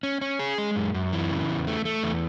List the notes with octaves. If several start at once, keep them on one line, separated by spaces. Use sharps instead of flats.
C#4
C#4
G#4
G#3
F#2
F#2
E3
C#3
E2
A3
A3
E2